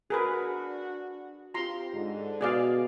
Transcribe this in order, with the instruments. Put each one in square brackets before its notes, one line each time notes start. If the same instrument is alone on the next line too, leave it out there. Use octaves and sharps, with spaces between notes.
[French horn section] D4 F#4 [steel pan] G#4 A#4 B4
[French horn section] C4 G4 [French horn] F4 [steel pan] A#5 C6
[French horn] G#2 [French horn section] D3
[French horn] B2 [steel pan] G#4 D5 F5